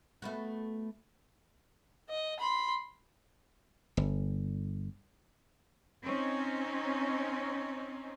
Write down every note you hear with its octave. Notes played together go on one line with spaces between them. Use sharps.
A3 B3 F#4
D#5
B5 C6
G1
C4 C#4 D#4